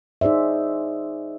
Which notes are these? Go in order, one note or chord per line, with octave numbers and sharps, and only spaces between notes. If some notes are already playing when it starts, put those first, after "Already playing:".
D#4 G#4 C5 D5 E5